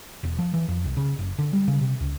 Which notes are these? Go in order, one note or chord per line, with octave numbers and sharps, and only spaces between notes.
E1
F3
E3
F2
C2
C#3
F#1
D3
G3
C#3
C3
C#2